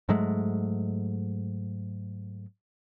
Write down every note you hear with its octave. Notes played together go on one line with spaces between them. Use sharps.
G#2 F#3 G#3 A3